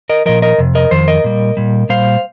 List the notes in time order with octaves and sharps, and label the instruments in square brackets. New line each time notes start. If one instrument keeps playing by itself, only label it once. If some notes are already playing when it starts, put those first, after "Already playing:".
[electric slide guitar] A#4 D#5
A#2 F3 A#4 D#5
A#4 D#5
F2 C3
A#4 D#5
F2 D#3 C5
A#4 D#5
A#2 G3
A#2 G3
A#2 G3 C5 F5